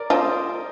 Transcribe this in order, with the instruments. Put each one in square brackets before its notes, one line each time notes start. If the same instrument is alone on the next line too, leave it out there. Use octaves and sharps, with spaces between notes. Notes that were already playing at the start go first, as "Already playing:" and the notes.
Already playing: [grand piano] A#4 D5
[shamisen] F4 [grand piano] C5 D#5